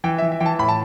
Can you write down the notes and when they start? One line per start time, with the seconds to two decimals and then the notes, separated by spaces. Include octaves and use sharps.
0.04 E3 G5
0.18 E5
0.22 E3
0.32 E5
0.40 E3 G5
0.46 A5
0.59 A2 B5
0.68 A5